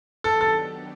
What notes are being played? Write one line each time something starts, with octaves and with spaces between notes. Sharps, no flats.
D#3 F#3 B3 D4 G4 A4
A4